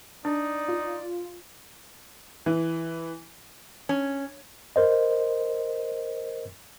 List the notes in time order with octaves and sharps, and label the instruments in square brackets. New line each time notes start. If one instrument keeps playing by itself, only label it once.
[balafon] D4 [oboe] D#4 [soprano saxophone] D5
[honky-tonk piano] F4
[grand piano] E3
[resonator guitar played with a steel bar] C#4
[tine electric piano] A#4 C5 D#5